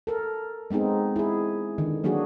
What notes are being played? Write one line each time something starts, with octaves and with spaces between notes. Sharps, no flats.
A4 A#4
G#3 B3 C4 D#4 G#4
E4 G#4
D3 D#3
F#3 A#3 D4 F#4 G#4